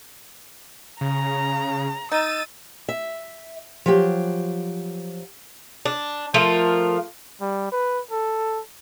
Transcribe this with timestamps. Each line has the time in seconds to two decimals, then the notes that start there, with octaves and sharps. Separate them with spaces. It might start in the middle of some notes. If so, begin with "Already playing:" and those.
1.01 C#3 A#5
2.12 D#4 E6 A6 D#7
2.88 E5
3.86 F3 F#3 G4
5.86 D4
6.34 F3 A3 F4 A#4
7.41 G3
7.72 B4
8.11 A4